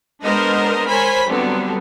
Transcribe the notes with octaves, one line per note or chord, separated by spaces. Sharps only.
G#3 B3 D4 A#4 C5 D#5
A#4 C5 C#5 G#5 B5
D3 F#3 G3 B3 C4